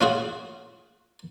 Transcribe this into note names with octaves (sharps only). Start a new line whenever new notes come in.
C#4 F4 F#4 G#4